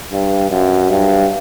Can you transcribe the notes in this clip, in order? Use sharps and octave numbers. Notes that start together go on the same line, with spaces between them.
G2
F#2
G2